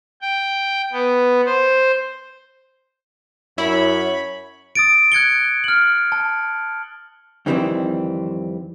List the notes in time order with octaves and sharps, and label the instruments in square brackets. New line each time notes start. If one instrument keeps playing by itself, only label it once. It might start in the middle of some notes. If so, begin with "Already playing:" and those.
[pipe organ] G5
B3
C5
[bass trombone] F#2 [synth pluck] E4 [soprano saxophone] C#5 [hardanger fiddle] B5
[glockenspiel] D#6 A6 D7
F#6 G#6 C#7 G7
F6 F#7
A5
[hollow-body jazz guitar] F2 D#3 E3 G3 B3 C4